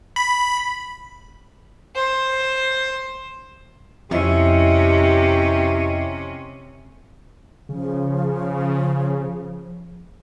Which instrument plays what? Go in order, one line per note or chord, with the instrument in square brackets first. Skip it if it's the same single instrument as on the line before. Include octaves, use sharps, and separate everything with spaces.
[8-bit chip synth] B5
[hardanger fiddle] C5
[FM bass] F2 [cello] C3 C#4 [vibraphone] E4 D#5 E5 [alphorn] G4
[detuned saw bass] C#3 [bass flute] F3